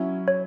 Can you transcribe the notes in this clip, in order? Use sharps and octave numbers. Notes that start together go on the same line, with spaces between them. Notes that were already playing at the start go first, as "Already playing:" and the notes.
Already playing: F#3 C#4 E4
C#5